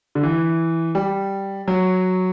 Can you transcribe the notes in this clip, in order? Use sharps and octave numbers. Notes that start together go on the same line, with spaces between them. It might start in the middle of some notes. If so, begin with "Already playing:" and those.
D3
E3
G3
F#3